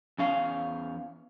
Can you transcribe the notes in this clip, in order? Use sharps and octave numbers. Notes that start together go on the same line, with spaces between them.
E2 C#4 F5